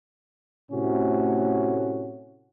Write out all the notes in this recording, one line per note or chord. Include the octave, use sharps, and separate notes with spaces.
A2 C3 A3 C#4 F#4